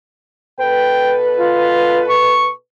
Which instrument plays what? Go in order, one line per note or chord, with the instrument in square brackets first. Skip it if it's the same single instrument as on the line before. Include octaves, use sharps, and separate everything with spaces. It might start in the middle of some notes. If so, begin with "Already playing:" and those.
[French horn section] B2 A4 B4 [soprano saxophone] G5
[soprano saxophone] F4
C#6